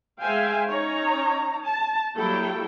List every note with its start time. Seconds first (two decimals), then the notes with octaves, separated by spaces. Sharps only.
0.21 G#3 C5 E5 F5 G5 G#5
0.67 C#4 D#4 C#5 A#5
1.63 A5
2.17 F#3 G3 A#3 E4 A4 G5